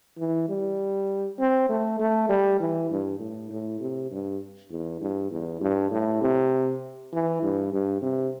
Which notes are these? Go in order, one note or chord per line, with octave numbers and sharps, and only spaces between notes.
E3
G3
C4
A3
A3
G3
E3
G2
A2
A2
C3
G2
E2
G2
E2
G2
A2
C3
E3
G2
G2
C3